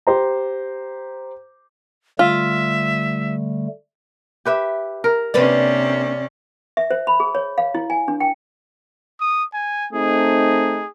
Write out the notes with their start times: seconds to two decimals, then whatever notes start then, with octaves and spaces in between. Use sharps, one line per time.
0.07 G4 C5 A#5
2.19 D3 G3 A3 F4 E5
4.45 G4 B4 E5
5.04 A#4
5.34 C3 A#3 C#4 D4 B4 D5
6.77 E5
6.91 C5
7.07 B5
7.20 G#4
7.35 C#5
7.58 F5
7.75 E4
7.90 G#5
8.08 D4
8.20 G5
9.20 D#6
9.54 G#5
9.93 A3 C4 D#4 G#4